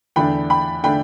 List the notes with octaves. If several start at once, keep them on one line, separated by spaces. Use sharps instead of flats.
E2 D3 A3 D4 G5 B5
G5 B5
D3 A3 D4 G5 B5